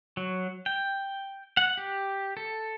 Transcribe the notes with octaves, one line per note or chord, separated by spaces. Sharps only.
F#3
G5
F#5
G4
A4